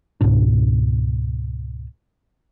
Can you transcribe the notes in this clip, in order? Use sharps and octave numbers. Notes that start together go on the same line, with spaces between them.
C#2 G#2 B2 D4